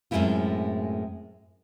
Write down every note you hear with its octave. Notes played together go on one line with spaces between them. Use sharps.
F#2 A2 G#3 C4 E4 F4